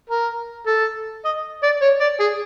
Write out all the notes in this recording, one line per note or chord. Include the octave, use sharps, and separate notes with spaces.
A#4
A4
D#5
D5
C#5
D5
G#4